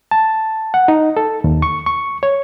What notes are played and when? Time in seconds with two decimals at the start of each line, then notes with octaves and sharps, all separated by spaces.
0.11 A5
0.74 F#5
0.88 D#4
1.17 A4
1.44 D#2
1.62 C#6
1.86 C#6
2.23 C#5